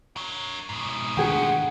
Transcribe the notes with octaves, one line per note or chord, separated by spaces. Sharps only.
A#4 C#5
G#2 B2
D#3 A3 D4 G#4 F#5 G5